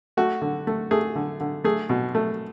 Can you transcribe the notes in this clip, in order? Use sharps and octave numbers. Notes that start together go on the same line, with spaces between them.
A3 F#4
D3
A3
A3 G#4
D3
D3
A3 G#4
B2
A3